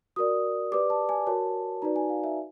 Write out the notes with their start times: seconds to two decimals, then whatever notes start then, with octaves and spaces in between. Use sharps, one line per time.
0.16 F#4 A#4 D5 D#6
0.72 G4 B4 D5 D6
0.90 A5
1.09 G#5
1.27 F#4 A#4 C#5 A5
1.82 D#4 F#4 B4 D5 A#5
1.96 G#5
2.09 F5
2.24 E5